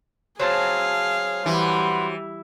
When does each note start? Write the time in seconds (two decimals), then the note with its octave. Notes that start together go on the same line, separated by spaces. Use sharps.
0.40 F#3 C4 G#4 F5 A5
1.46 E3 G3 B4 F#5 C6